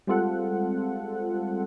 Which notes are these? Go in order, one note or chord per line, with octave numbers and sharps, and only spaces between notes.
G3 G#3 C4 F4 A4 F#5